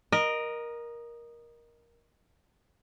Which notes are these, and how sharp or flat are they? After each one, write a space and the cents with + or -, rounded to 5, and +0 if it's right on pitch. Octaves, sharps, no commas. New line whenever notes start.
A#4 +15 D#5 -15